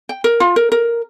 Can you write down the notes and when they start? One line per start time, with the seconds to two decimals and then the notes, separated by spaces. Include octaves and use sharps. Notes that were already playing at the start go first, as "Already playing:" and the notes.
0.09 G5
0.24 A#4
0.40 F4
0.56 A#4
0.72 A#4